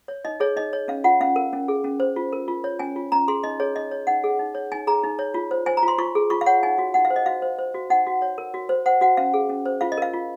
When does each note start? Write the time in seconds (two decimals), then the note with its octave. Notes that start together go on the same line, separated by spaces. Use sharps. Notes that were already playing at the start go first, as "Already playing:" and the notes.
0.08 C#5
0.25 D#4 D#5
0.40 G#4 C#5
0.56 D#4 D#5
0.73 C#5
0.88 C#4 F5
1.04 F4 F#5
1.20 C#4 F5
1.36 A#4
1.53 C#4
1.68 G#4
1.84 C#4
2.00 C5
2.16 F4
2.33 A#4
2.48 F4
2.64 C#5
2.79 C#4 G#5
2.96 F4
3.12 C#4 A#5
3.28 G#4 C6
3.44 D#4 D#5
3.60 G#4 C#5
3.76 D#4 D#5
3.91 C#5
4.07 D#4 F#5
4.24 G#4
4.39 D#4
4.55 C#5
4.72 D#4 G#5
4.87 G#4 A#5
5.04 D#4
5.19 C#5
5.34 F4
5.51 C5
5.66 C5 G#5
5.77 A#5
5.83 F4
5.88 C6
5.98 F4 C#6
6.15 G#4
6.30 F4 C#6
6.41 F5
6.46 C#5 F#5
6.63 D#4 G#5
6.78 F#4
6.94 D#4 F#5
7.05 F5
7.10 C5
7.16 D#5
7.26 F#4 F5
7.42 C5
7.58 C5
7.74 F#4
7.90 D#4 F#5
8.06 F#4
8.22 C#5
8.38 A#4
8.54 F#4
8.69 C5
8.86 C5 F#5
9.01 F#4 F#5
9.17 C#4 F5
9.34 G#4
9.49 C#4
9.66 C5
9.81 F4 F5
9.92 D#5
9.97 A#4 F5
10.13 F4